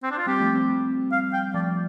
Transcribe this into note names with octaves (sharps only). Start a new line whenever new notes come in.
C4
D4
F4
G3 C4 G4
F3 A3
G3 C4
G3 C4
F5
G5
F3 A3 D5